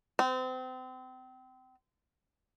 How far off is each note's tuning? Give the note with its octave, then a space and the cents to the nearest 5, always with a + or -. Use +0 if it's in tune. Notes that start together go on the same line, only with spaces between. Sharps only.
C4 -30